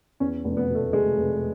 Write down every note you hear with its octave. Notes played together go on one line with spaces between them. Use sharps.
E2 C#4
F1
B3
B2
A3
F1 G#3
F1